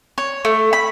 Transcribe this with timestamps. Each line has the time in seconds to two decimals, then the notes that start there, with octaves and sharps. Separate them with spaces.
0.18 C#5
0.45 A3
0.73 B5